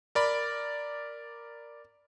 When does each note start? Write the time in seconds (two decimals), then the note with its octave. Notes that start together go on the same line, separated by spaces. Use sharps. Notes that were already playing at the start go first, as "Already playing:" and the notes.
0.15 A#4 D5 B5